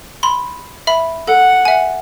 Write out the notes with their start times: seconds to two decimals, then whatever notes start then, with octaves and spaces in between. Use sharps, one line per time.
0.23 B5 C6
0.87 E5 B5
1.27 A4 F#5
1.65 E5 G#5